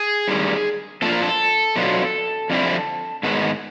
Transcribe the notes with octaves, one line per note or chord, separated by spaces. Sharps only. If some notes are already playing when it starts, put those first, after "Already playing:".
Already playing: G#4
G2 D#3 G3
A#2 F3 A#3 D4 F4 A4
A#4
A4
B2 F#3 B3 D4 F4
F2 D3 G3 C4 E4
G#2 D#3 G#3 B3